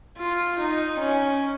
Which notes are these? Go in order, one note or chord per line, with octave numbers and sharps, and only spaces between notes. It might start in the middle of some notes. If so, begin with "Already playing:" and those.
F4
D#4
C#4